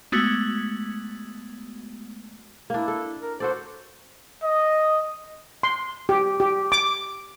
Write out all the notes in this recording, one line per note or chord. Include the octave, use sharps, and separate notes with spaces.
G#3 A3 B3 F#4
A#3 D4 E4
A4
A#4
F#4 A4 C5 D5
D#5
C6
G4
G4
D6